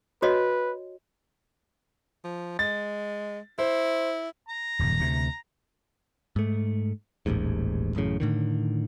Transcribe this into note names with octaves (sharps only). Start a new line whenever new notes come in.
F#4 B4 C#5 D#5
F3
G#3 A6
E4 C5
A#5
D#1 F#2
D2 C3
G#2 A3
D#1 A1 D#2 G#2
A1 F#2 A2 C#3
A2 D3 D#3